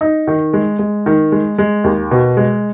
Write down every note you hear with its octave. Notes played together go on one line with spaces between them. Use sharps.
D#4
D#3
G#3
G#3
D#3
G#3
G#3
D#2
B2
G#3